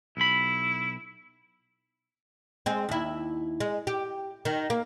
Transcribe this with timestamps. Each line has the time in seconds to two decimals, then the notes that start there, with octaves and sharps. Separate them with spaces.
0.17 B1 E4 B5
2.66 G#3 C4
2.89 D#2 E4
3.60 G#3
3.87 G4
4.45 D#3
4.70 A#3